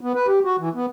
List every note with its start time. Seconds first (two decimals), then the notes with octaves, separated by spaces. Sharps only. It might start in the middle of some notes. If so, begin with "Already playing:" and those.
0.01 B3
0.15 B4
0.27 G4
0.45 F#4
0.58 E3
0.75 B3